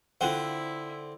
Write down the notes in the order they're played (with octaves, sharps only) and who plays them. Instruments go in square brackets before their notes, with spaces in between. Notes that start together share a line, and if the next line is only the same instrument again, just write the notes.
[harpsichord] D3 C4 [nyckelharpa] E4 [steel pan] F4 F#5